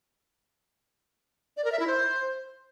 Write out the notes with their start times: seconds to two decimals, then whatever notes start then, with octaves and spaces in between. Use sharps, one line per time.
1.57 D5
1.64 A#4
1.72 E5
1.80 E4
1.87 C5